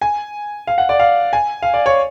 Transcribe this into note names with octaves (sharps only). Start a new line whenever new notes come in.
G#5
F5
F#5
D5
F5
G#5
F5
D5
C#5